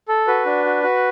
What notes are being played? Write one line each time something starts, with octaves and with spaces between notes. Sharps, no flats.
A4
F#4 B4
D4
F#4
F#4